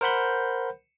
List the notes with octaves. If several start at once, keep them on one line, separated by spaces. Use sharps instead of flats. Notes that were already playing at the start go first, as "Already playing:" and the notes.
A#4 C5 F#5 B5 G6